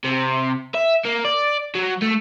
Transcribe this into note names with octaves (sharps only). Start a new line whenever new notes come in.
C3
E5
A#3
D5
F#3
A3